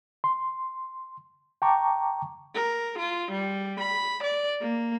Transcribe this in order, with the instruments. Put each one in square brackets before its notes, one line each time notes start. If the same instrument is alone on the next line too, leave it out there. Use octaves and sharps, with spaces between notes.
[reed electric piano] C6
G5 A5 A#5 C#6 D6
[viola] A#4
F4
G3
B5
D5
A#3